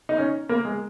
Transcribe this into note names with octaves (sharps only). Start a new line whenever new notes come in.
D#4
C#4
A#3
G#3